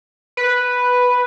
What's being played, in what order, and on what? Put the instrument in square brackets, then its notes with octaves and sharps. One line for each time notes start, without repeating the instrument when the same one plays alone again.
[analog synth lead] B4